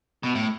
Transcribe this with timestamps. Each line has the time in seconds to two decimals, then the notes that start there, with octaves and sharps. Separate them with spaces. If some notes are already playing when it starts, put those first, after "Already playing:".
0.23 B2
0.35 A2